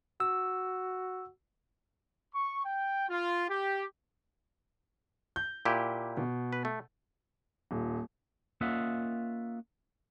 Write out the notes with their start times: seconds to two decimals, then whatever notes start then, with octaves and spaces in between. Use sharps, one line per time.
0.20 F#4 E6
2.34 C#6
2.65 G5
3.09 F4
3.49 G4
5.36 G6
5.65 A#2 E4 G4
6.17 B2
6.53 B4
6.65 A3
7.71 D#1
8.61 A#3 C#4 F4 D#5 E5 F#5